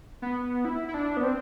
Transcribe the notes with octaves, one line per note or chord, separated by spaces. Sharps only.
B3
E4
E4
D4
B3
C4